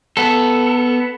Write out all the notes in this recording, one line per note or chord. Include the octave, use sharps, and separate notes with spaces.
B3 A4